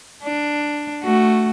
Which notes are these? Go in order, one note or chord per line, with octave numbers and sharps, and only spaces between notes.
D4
A3 F#4